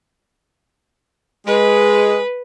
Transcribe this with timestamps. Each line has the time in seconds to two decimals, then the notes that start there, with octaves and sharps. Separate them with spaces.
1.47 G#3 B4